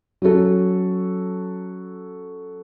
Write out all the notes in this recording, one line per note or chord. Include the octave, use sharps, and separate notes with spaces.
F#3 C#4 F#4 A4